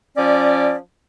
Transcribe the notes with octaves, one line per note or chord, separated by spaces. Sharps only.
F3 C#4 D5